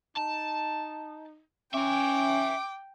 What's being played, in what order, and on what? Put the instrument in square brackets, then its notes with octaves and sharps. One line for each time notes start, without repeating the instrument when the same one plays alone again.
[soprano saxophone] D#4 [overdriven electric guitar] A5
[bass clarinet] C#4 [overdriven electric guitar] E5 G#5 [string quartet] G5 [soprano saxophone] D6